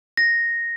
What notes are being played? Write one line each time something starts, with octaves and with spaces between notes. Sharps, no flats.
A#6